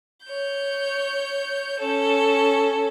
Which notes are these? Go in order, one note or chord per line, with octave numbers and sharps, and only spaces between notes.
C#5 G6
C#4 A4